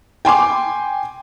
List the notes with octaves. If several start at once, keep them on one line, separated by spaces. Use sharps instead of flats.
G5 G#5 C6 D6